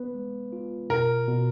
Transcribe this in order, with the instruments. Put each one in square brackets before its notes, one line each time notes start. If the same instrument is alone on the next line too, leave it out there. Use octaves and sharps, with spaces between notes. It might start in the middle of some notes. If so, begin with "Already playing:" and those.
Already playing: [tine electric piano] B3 B4
G#3
F4
[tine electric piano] B2 [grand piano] A#4
[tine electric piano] B2